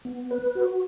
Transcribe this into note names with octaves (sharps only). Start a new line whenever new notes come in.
B3
B4
F#4